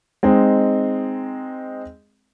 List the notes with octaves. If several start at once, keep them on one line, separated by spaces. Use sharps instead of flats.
G#3 C4 D#4